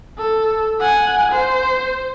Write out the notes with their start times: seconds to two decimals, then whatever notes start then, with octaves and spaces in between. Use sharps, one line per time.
0.18 A4
0.80 F#5 G#5
1.32 C5